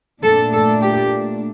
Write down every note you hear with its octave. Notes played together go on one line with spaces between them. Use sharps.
A#2 A3 D4 A4
A4
G4